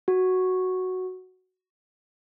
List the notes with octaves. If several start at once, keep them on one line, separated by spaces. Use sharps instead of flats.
F#4